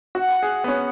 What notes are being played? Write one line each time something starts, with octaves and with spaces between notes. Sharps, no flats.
F#4 F#5
G#4
B3
C#4